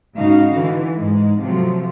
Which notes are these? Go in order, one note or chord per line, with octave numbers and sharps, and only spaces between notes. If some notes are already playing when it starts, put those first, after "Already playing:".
G#2 C#3 D#4 F#4 F5
D3 E3
G#2 G#3
C3 F3 F#3 A3